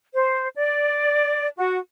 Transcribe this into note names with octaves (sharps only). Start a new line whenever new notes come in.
C5
D5
F#4